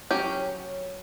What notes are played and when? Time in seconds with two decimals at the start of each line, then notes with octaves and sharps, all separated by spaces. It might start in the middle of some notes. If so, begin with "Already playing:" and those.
0.11 F#3 C#4 G4